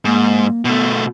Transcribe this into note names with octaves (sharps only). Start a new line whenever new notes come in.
G#2 A#3
B2 A3 B3